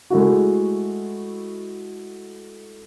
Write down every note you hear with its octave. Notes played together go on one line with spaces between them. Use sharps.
G#3 A3 E4 F#4